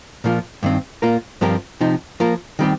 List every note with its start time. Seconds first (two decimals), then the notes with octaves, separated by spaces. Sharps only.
0.24 A#2 F3 A#3 F4
0.63 G2 D#3 C4
1.02 A#2 A#3 F4 A#4
1.41 G2 F3 C4 G4 A#4
1.81 C3 F3 D#4
2.20 F3 A#3 F4 A#4
2.59 D#3 G3 C4 G4